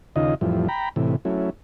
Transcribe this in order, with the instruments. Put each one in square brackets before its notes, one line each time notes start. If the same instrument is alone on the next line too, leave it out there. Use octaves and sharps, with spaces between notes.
[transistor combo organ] D#2 C#3 D#4 F4 D#5
F2 A2 E3 F3 G3
G5 A#5 B5
A2 C3 E3
F#3 A3 C#4 E4